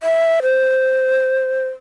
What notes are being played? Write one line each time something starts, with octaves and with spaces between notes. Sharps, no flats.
E5
C5